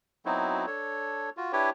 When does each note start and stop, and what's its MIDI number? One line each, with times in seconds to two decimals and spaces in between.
0.26 0.66 54
0.26 0.66 59
0.26 0.66 60
0.26 0.66 63
0.26 0.66 64
0.26 0.66 66
0.67 1.30 62
0.67 1.30 69
0.67 1.30 73
1.37 1.52 65
1.37 1.52 66
1.53 1.70 62
1.53 1.70 64
1.53 1.70 67
1.53 1.70 71
1.53 1.70 73
1.53 1.70 79